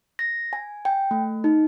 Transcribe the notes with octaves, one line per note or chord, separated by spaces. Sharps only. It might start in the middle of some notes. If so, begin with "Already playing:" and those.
A#6
G#5
G5
A3
D#4